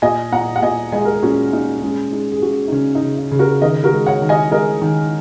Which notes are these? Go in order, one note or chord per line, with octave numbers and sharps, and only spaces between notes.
A#2 D#5 G#5
A#2 F#5 A#5
F#5
A#2 D#5 G#5
G#3 D#5 G#5
A#4
G#4
A#2 C#4 F#4
A#2 D#4
G#3 C#4
G#3 D#4
G#4
G#3 C#4 F#4
D#4
C#3 C#4
D#4
C#3
D#4
C#3
F#4 A#4
D#3 A#4 D#5
F#4 A#4
G#3
C#5 F#5
D#3
D#5 G#5
G#3 A#4 D#5
D#3